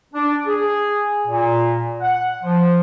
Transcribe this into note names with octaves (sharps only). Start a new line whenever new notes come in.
D4
G#4
A#2
F#5
F3